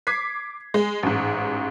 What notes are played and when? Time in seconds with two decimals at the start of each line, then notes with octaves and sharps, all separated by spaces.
0.07 D6 G#6 B6 C7
0.74 G#3
1.03 A1 G#2